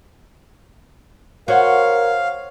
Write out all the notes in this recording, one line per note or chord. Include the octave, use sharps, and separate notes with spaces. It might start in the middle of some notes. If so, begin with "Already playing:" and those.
F#4 A#4 C5 C#5 F5 F#5